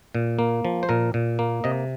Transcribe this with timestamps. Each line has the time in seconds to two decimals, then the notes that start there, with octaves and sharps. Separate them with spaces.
0.15 A#2
0.39 A#3
0.65 F3
0.83 C5
0.89 A#2 A#4
1.14 A#2
1.39 A#3
1.64 C3 D#5